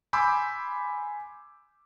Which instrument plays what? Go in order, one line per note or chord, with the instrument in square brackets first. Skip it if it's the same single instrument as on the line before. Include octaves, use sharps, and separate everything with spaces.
[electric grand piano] G#5 B5 C6 D6 E6 G6